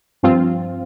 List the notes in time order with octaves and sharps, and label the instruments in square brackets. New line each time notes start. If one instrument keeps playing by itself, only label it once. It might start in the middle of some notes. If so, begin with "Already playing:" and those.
[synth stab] G2 F3 C4 F4